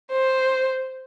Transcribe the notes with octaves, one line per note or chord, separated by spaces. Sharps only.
C5